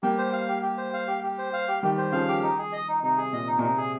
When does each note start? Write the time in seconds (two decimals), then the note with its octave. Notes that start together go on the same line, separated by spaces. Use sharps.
0.03 G3 A#3 G4
0.18 C5
0.33 F5
0.48 G4
0.63 G4
0.78 C5
0.94 F5
1.08 G4
1.23 G4
1.38 C5
1.53 F5
1.68 G4
1.83 D#3 G3 G4
1.98 C5
2.12 C#3 F3 F5
2.28 G4
2.43 D#4
2.58 G#4
2.72 D#5
2.88 D#4
3.03 C3 D#4
3.18 G#4
3.33 A#2 D#5
3.48 D#4
3.59 A#2
3.62 C3 D#4
3.77 G#4